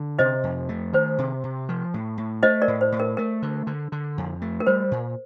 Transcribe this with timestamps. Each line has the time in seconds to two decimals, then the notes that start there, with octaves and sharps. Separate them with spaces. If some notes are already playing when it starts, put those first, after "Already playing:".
Already playing: D3
0.19 C3 C5 D#5
0.43 F2
0.69 A3
0.93 D#3 C5
1.18 C3
1.44 C3
1.69 F3
1.94 A2
2.18 A2
2.43 A3 C5 D#5
2.62 A#4 D5
2.68 A2
2.81 C5
2.92 A2
3.00 A#4
3.17 A3 A#4
3.42 D3
3.67 D3
3.92 D3
4.18 F2
4.42 A3
4.60 A#4
4.67 G3 C5
4.91 A#2